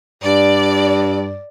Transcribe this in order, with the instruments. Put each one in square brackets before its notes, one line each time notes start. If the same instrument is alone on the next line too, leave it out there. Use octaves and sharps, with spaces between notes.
[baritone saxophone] G2 [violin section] D5